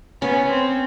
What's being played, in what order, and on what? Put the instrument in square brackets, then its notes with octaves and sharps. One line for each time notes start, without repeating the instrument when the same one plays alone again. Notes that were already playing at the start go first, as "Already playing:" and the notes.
[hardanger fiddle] B3 [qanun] C#4
[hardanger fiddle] C4